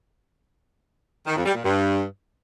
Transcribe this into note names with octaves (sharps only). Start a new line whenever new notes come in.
D#3
F2
G3
A#2
G2